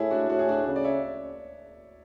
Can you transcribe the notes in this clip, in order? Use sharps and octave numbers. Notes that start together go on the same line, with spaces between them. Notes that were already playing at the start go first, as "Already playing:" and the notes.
Already playing: A2 E4 G#4
D4 F#4
A2 F#4
G#4
D4 F#4
C#3
D5
C#5 E5